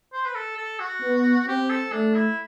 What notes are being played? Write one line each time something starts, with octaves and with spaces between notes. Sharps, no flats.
C5
B4
A4
A4
F#4
B3
C4 G4
A4
A3 D4
E4